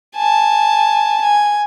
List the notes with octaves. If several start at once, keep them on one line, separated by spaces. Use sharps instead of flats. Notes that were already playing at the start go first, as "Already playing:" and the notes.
G#5 A5
G#5